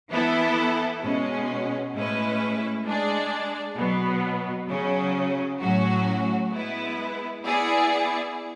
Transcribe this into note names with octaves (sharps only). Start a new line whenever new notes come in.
E3 B3 E4 A4
B2 G#3 C#4
A2 G#3 C#4 E4 B4
G#3 D4 G#4 D5
B2 F#3 B3
C#3 F#3 C#4
A2 F#3 C#4 F#4
G#3 B3 E4 B4
B3 E4 G#4 D5